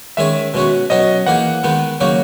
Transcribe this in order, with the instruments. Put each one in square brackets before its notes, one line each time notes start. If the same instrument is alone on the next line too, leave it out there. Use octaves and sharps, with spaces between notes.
[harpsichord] D#3 G#3 C#4 G#4 [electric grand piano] E5
[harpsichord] B2 G#3 C#4 F#4
[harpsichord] B2 F#3 C#4 F#4 [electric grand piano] D#5
[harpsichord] E3 A#3 D#4 G#4 [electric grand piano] F#5
[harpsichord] D#3 G#3 B3 D#4
C#3 F#3 A#3 D#4 F#4